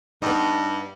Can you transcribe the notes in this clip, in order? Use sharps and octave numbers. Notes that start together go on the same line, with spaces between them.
G2 B3 D#4